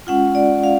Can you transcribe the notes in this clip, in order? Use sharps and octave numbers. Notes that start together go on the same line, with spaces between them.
G#3 C#4 F4 F#5
D5
F5